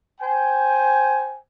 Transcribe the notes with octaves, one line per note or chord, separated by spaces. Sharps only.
C5 G5 G#5